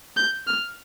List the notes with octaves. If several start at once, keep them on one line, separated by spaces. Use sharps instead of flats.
G6
F6